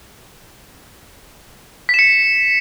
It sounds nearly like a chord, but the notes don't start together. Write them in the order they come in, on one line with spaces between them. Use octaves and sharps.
B6 E7 C#7